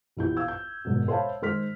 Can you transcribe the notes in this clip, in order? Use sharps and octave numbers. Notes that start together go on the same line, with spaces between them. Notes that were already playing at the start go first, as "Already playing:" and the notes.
A#1 E2 E4 G4 G6
F5 E6 G#6
G6
G#1 G#2 B2
C5 C#5 E5 F5 A5 B5
D#3 G#3 C5 F6 B6